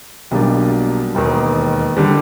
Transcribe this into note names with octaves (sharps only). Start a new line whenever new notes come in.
B1 B2 G3 A#3 D4
E1 D#2 D#3
D3 G3